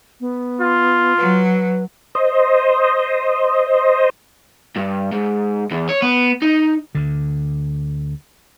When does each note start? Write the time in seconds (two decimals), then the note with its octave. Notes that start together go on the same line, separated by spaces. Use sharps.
0.20 B3
0.61 F4
1.17 F#3 B4
2.15 C5 D#5
4.77 G2
5.12 G#2
5.71 E2
5.89 C#5
6.02 B3
6.42 D#4
6.95 D2 D3